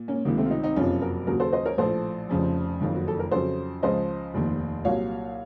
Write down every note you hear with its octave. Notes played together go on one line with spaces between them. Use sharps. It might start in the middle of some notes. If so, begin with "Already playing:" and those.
Already playing: A#2
A#3 C#4
C#2 C3 D#3 A#3
A3 C4
F4
C4 D#4
C4 D#4
F#1 F2 C3 F3 C#4 F4
F#4 A#4
D#2 C#3 F#3 F#4 A#4
A4 C5
C5 D#5
A#4 C#5
A#1 A2 F3 A4 C5
F1 F2 C#3 F3
F#1 F2 D#3 F4
F#4
A4
A#4
F2 C#3 F#3 A4 C5
C#2 C#3 F3 C5 D#5
F1 D#2 D#3
C2 A#2 F#3 C#5 F5